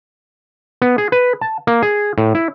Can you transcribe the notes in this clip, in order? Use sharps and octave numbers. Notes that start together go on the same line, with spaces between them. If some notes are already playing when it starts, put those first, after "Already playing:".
B3
G#4
B4
A5
A#3
G#4
A2
E4